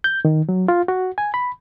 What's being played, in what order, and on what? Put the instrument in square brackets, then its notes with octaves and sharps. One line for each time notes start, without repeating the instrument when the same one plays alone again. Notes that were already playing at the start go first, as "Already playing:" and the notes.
[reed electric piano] G6
D#3
F#3
F4
F#4
G#5
B5